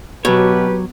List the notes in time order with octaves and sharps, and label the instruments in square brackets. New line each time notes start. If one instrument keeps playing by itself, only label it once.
[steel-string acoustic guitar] B2 [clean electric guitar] F#3 C#5 [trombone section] G4 B4